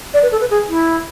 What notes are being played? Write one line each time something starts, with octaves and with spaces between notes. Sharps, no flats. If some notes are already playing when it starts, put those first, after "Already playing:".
D5
B4
A4
B4
G#4
E4